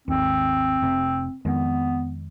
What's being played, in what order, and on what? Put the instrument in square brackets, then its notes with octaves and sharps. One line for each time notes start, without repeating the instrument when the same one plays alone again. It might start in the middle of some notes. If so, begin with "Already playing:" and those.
[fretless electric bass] G#1 D#2 [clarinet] C4
[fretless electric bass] F1 C3
[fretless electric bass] F2 D#3 G#3 [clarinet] B3